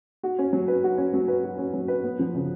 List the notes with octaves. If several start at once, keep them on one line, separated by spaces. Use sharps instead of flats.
F#4
C#4
F#3
B4
F#4
C#4
F#3
B4
F#4
C#4
F#3
B4
B3
F3
C#3